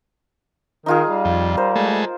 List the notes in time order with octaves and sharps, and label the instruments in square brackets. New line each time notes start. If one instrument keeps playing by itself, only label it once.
[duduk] D#3 [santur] D#4 F4 G#4
[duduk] G3
[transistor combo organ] F2
[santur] A#4 C5
[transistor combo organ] G#3 A3